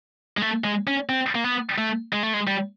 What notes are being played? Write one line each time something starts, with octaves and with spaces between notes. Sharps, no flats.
G#3
A3
G#3
C#4
C4
A#3
B3
A3
G#3
A3
G#3
G3